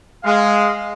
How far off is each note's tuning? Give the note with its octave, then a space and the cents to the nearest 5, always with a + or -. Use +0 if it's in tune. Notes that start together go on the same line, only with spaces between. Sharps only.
G#3 +0 F5 +0